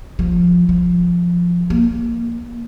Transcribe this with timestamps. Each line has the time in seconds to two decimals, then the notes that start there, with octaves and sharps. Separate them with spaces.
0.19 F3
0.69 F3
1.70 A#3